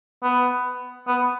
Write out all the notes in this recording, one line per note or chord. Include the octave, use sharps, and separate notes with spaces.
B3
B3